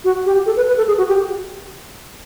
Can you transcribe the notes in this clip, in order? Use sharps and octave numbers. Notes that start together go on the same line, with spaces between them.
F#4
G4
A4
B4
B4
A4
G#4
F#4
G4